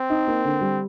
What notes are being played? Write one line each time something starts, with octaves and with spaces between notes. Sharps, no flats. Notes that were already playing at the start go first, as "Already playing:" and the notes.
Already playing: C4
D#4
A#3
D3
G3